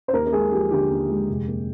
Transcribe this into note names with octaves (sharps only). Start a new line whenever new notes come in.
C5
D#2 A#4
A#4
G#3 G#4
F3 G4
D3 G4
D#2
G#3
F1
A#3